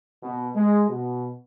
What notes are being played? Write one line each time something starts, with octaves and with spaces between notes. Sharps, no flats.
B2
G#3
B2